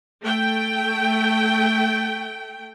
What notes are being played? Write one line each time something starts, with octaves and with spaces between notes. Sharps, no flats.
A3 G5